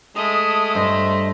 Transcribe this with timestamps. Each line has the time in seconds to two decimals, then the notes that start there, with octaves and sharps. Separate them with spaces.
0.16 G#3 A3 D#6
0.75 G2 C5 D#5